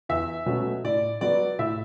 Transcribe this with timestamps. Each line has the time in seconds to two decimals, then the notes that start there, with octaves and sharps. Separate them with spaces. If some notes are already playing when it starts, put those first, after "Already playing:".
0.09 E2 E5
0.46 B2 F#3 A3 C#4
0.84 A2 D5
1.21 F#3 B3 D5
1.59 A2 E5